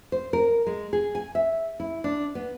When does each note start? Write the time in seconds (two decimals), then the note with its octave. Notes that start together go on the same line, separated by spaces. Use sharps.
0.12 C5
0.33 A#4
0.67 G#3
0.93 G#4
1.15 G#5
1.35 E5
1.80 E4
2.04 D4
2.35 B3